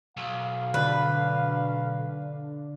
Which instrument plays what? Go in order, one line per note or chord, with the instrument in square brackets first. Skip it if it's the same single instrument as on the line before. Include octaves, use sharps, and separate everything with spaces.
[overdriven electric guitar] B1 [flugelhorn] F5
[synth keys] D3 D4 [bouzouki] B4